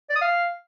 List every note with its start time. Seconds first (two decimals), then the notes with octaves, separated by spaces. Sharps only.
0.10 D5
0.15 D#6
0.21 F5